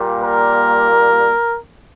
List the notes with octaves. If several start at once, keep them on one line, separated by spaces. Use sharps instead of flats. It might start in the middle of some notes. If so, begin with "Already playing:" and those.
Already playing: A#2 G3 A#3
A#4